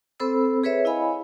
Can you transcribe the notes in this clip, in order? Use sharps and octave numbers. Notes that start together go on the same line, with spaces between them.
C4 A4 C5 B5 E6
G#4 B4 C#5 E5
E4 D#5 F5 G#5 B5